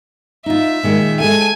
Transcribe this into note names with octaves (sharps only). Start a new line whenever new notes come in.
D#4 F4 E5
A#2 D#3 G#3
G#3 A4 G#5